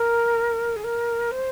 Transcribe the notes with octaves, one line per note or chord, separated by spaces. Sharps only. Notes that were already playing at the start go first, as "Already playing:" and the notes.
Already playing: A#4
G#4
A#4
C5